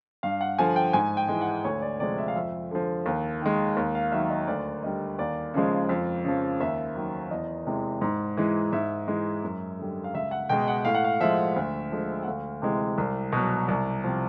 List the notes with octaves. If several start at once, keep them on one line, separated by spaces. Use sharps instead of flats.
G2 F5
F#5
D3 F3 G#5
G5
G#2 G#5
G5
E3 G#3
F#5
D2 C#5
D5
C3 F3 G#3 D5
E5
F5
F2 E5
D3 F3
D#2
D#3 G#3
D#2
F5
D#3 F#3 E5
D#5
D2 D5
D3 G3 D#5
D#2 D5
C#3 F3 G#3
F2
C#3 F3
D#2 E5
D#3 F#3
E2 D#5
C3 E3 G#3
G#2
E3 G#3
G#2 E5
E3 G#3
F#2
D3 G3
F5
C#2 E5
F#5
B2 G#3 G5
F#5
A2 F5
F#5
F5
F3 G#3 E5
D2
D3 F3 G#3
F#5
D2 F5
C3 E3 G#3
C2
B2 F#3
C2
C3 F3